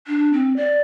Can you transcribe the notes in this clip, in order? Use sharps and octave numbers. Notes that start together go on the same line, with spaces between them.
D4
C4
D5